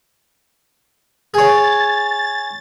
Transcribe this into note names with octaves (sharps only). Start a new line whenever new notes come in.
G#4 C#5 A6